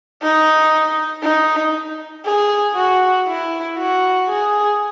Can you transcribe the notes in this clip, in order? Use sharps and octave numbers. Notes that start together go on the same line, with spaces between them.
D#4
D#4
G#4
F#4
E4
F#4
G#4